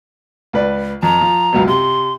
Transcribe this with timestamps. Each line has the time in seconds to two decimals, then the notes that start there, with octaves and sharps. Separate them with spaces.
0.53 C#2 B4 D5
1.03 F2 A#5
1.21 F3
1.53 C#2 F#2 B2
1.68 C3 C6